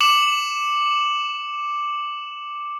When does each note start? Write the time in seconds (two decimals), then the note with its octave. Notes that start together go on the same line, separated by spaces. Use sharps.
0.01 D6 C#7 E7 F#7